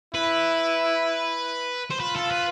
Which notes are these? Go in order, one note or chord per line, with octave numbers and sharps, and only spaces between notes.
E4 B4
C5
F4 B4
A4
B4